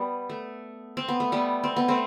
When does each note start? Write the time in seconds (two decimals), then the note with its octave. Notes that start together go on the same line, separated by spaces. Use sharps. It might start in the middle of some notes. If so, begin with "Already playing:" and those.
Already playing: G3 B3
0.30 A3
0.97 C4
1.08 B3
1.20 A3
1.32 G3 B3
1.63 C4
1.77 B3
1.88 A3 C4